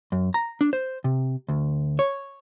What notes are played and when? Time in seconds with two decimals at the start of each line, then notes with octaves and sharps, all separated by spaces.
0.12 F#2
0.34 A#5
0.61 D4
0.73 C5
1.04 C3
1.49 D2
1.99 C#5